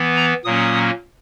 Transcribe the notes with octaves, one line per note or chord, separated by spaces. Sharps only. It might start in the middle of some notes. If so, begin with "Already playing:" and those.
Already playing: E3 B3
A#5
A#2 F#3 A#3 C#4 D#6